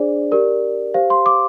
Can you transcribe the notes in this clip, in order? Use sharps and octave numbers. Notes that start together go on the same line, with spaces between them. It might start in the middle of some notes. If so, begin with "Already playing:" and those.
Already playing: D4 G#4 C5 D5
G4 A#4 D5
G4 C5 F5
C6
D6